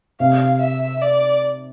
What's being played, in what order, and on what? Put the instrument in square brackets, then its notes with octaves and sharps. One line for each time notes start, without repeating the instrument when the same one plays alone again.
[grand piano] C3 [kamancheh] F5
[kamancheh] E5
D5